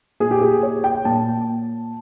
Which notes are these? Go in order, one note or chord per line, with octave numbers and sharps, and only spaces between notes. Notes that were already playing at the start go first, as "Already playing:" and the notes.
A#2 G#4
G4
G#4
C#5
G5
A#2 A5